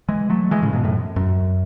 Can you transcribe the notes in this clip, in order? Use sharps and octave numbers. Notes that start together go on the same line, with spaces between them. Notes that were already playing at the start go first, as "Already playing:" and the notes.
E3 G#3
F#3 A3
E3 G#3
A2 C#3
G#2 B2
F#2 A2
F#2